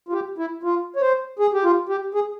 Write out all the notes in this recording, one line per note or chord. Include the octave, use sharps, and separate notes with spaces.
F4
G4
E4
F4
C#5
C5
G#4
G4
F4
G4
G#4